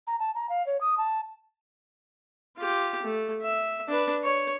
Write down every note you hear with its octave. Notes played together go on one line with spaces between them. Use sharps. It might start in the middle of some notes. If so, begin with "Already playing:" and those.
A#5
A5
A#5
F5
C#5
D#6
A5
F4 G4
A3
E5
D4 B4
C#5